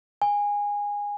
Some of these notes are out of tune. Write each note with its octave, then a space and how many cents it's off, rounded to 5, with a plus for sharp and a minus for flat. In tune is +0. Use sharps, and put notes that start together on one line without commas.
G#5 -20